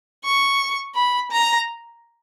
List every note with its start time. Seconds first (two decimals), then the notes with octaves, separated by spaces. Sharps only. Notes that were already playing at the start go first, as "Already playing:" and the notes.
0.24 C#6
0.95 B5
1.31 A#5